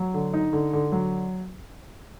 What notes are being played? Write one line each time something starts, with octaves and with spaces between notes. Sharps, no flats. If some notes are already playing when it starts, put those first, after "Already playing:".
Already playing: F#3
D3
D#4
D3
D3
F#3